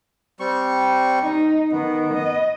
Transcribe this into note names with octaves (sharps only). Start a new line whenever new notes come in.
G3 C4 C#6
D#4
D#3 B3
D#5